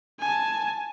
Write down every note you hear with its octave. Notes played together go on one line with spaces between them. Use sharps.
G#5 A5